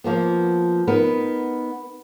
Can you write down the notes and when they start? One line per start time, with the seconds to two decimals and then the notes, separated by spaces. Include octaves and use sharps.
0.04 F3 A#3 B3
0.87 B3 D#4 A#4 B4